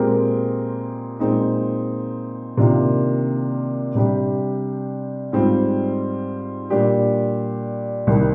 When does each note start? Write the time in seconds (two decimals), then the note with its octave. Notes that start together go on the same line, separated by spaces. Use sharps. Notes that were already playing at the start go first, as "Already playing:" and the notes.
Already playing: A#2 G#3 C4 G4 A#4
1.20 A#2 G#3 C4 D#4
2.57 C3 D#3 A#3 D4 F4
3.95 C3 G3 D4 G4
5.32 G#2 G3 C4 F4
6.70 A#2 G3 D4 G4
8.07 C2 C3 D#3 G3